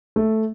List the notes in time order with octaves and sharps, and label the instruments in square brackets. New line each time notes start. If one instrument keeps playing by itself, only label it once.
[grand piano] A3